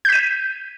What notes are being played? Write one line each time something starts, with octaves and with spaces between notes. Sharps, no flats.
G6 B6 D#7